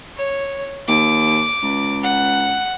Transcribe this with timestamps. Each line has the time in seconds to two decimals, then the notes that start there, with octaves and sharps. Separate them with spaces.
0.16 C#5
0.88 D#2 D6
1.63 C#2
2.04 F#5